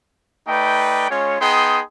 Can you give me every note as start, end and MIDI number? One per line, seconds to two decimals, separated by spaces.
0.48 1.08 57
0.48 1.08 63
0.48 1.08 71
0.48 1.08 74
0.48 1.08 79
1.10 1.40 56
1.10 1.40 61
1.10 1.40 65
1.10 1.40 73
1.41 1.82 59
1.41 1.82 63
1.41 1.82 68
1.41 1.82 79
1.41 1.82 84
1.41 1.82 87